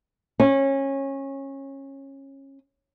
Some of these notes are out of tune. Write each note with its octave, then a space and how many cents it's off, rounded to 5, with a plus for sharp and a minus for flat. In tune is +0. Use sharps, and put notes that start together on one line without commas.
C#4 -20